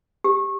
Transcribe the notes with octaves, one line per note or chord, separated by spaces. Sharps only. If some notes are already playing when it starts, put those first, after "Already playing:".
G4